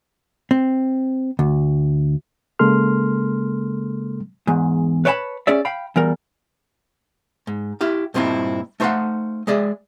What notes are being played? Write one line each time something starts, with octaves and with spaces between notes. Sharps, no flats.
C4
D2
C#3 G#3 A#3 A4 C6 F6
E2 G#2
B4 C#5 D5 G5 A5 B5
C#4 G#4 D5 E5
F5 G5 B5
E2 G3 A#4
G#2
E4 G4 F5
G2 A#2 C4 D#4 E4
A3 D#4 C5 D#5 F5 F#5
G#3 G#4 D5 E5